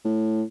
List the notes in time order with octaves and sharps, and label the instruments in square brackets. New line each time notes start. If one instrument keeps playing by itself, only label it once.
[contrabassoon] A2